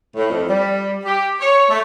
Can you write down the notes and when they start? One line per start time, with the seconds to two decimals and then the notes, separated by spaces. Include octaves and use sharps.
0.16 A2
0.29 F2
0.49 G3
1.05 G4
1.40 C#5
1.69 A3